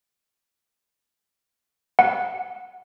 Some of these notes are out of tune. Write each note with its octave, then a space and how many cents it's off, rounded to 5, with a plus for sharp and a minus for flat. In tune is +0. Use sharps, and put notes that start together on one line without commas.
F#5 -15